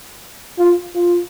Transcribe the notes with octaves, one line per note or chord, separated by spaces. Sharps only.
F4
F4